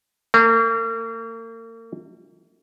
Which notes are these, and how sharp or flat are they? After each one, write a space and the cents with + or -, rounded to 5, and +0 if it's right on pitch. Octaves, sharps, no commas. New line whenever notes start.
A#3 -40